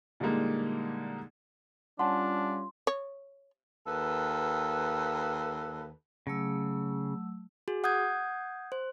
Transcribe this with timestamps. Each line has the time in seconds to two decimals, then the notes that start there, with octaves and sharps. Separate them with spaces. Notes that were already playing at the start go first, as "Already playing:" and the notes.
0.20 A#2 D3 G3 G#3 A#3 D#4
1.99 G3 C#4 D4 F4 F#5 A5 C6
2.87 C#5
3.86 D#2 A4 B4
6.27 C#3 F#3 A3 E6
7.68 F#4 G#4
7.84 F#5 D#6 G6 G#6
8.72 C5